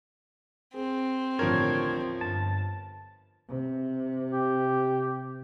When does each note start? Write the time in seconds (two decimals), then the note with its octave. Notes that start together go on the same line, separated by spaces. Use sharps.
0.74 C4 G#4
1.39 A1 D#2 D3 F3 A#4 C#5
2.21 G1 A5
3.49 C3
4.32 G4